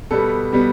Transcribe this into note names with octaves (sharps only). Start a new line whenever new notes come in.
B2 G3 B3 A4
B2 G3 B3